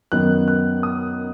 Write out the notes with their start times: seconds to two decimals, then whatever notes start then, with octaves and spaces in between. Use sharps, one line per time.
0.12 F#2 D#3 F#3 B3 F#6
0.48 F#6
0.83 D#6